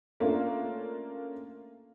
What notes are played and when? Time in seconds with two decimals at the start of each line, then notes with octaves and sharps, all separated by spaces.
0.20 A3 A#3 C#4 D4 F4